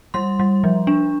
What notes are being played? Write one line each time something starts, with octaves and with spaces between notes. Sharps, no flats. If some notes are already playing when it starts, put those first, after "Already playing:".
G3 C6
G3
F3
D4